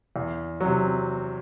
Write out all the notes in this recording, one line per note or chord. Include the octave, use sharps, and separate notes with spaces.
E2
C3 F#3